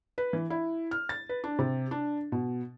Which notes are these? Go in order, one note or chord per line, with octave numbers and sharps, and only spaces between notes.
B4
E3
E4
F6
A6
B4
D4
C3
D4
B2